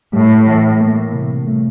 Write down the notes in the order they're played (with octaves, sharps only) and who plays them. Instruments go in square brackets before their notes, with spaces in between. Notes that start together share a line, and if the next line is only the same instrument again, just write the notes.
[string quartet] A2 [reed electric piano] G3
[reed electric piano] E3
A#3
C3
A3